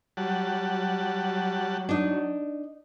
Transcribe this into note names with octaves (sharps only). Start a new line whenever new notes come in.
F#3 G3 F#5 A5
D4 D#4